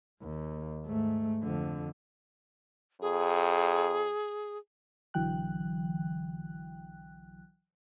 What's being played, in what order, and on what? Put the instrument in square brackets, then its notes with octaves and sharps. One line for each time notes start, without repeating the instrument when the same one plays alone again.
[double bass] D#2
G#2 A3
F2 D3
[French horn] F2 [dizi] G#4
[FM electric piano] B1 D3 E3 F#3 G5 F#6